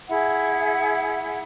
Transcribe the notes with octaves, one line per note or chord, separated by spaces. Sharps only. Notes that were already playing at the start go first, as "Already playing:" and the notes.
E4 G#4 E5 F#5